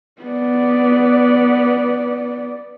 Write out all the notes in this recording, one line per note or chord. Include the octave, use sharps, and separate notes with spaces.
B3 D5